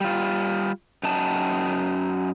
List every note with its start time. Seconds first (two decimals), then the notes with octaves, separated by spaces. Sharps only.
0.01 G3 F4
1.03 F#2 D#4 A5